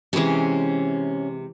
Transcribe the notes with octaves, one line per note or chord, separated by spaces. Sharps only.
C3 E3 G#3 C#4